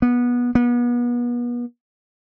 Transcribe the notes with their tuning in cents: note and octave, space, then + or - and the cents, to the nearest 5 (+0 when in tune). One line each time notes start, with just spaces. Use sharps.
B3 -20
B3 -35